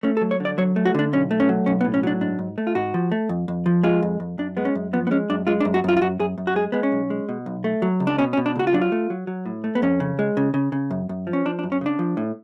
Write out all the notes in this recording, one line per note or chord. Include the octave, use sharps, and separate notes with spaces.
A3 C#4
A4
F#3
C#5
D3 D5
F#3 C#5
A3
F#4
D3 D4
B1 C#4
A3
C#4
F#3
B1 C#4
B3
A2
C#4
F#3 D4
G#2 D4
G#2
A3
F4
G#2 F#4
F3
A3
F2
F2
F3
G#3 F4
F2
F2
F#2 D4
G#3 B3
C#4
F#2
F3 B3
B3
G#3 C#4
F#2 D4
G#3 F4
D4
F#2
F#4
F#2 F4
F4
F#2 F#4
F#2 G#4
F#2
F#4
G#3 G#4
G#3 B3
C#4
B1
G#3
B2
B1
A3
F#3
C#2
D4
B2 C#4
C#4
B2
D4
C#2 F#4
F4
F#3 D4
F4
A3
F#3
F#3
A2
A3
B3
F2 C#4
C#3
G#3
C#3
C#3
C#3
F#2
F#2
F3
C#4
F3 D4
D4
F#2
C#4
C#3 D4
F3
A2